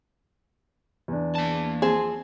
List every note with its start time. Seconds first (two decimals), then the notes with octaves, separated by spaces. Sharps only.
1.08 E2 D4
1.36 A#3 A5
1.82 F3 C4 G#4